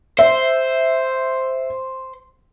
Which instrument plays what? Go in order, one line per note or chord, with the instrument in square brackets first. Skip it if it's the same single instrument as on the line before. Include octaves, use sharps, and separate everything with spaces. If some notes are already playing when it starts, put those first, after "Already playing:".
[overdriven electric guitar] C5 [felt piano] E5